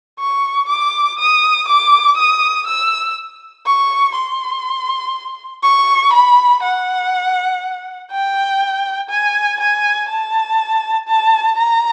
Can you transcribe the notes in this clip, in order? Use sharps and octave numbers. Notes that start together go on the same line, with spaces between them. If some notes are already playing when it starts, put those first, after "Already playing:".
C#6
D6
D#6
D6
D#6
E6
C#6
C6
C#6
B5
F#5
G5
G#5
G#5
A5
A5
A#5